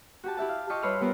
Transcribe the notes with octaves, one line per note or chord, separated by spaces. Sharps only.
F#4 G4 A5
E4 G4 E5 A5
F5
F4 G4 D#5 E5 A5 C#6
G2 B4 C#5 C6 E6 F6
G3 B3 F4 A#4 C5